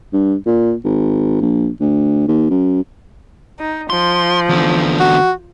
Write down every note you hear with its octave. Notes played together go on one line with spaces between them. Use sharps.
G2
A#2
G#1
A#1
D2
D#2
F#2
D#4
F3 C6
E2 D3
F#4